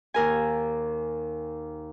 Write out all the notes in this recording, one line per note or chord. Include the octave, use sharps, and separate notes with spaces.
D#2 A#4 G#5